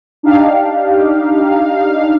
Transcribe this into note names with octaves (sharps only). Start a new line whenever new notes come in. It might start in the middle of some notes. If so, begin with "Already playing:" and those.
D4 D#4 G4 F5